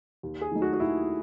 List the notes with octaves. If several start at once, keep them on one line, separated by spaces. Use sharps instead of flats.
D#2
G#4
D#3 F#3 A3 D#4
F#4
F#4
D#2 E4